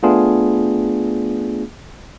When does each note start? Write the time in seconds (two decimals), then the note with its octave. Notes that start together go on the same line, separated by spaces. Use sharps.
0.03 A3 B3 D4 F4 G#4